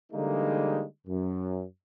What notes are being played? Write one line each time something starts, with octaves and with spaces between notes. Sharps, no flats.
D3 E3 G3 G#3 A#3 D#4
F#2